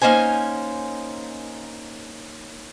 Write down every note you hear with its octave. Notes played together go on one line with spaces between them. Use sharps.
A#3 C#4 D#4 C5 G#5